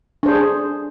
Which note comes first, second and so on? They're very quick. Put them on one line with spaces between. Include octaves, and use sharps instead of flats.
D4 C5 G#4